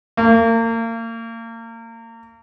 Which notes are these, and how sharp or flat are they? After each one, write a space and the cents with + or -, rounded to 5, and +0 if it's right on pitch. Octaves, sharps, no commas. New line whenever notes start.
A#3 -35